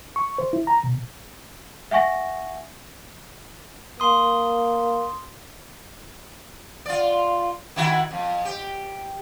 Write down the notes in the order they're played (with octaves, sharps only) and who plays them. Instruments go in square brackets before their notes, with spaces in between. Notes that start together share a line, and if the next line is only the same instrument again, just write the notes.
[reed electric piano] C#6
C5
E4
A#5
B2
[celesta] E5 F#5 G#5 C#6 A#6
[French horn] A#3 [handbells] C6 D#6
[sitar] F4 D5
D#3 E4 F#4
F2
G4